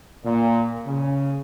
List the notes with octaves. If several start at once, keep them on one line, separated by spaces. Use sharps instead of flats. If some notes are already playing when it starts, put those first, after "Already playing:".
A#2
C#3